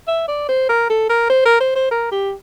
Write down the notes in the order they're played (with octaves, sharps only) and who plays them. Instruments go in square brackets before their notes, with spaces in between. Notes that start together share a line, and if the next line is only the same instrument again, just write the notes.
[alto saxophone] E5
D5
C5
A#4
A4
A#4
C5
A#4
C5
C5
A#4
G4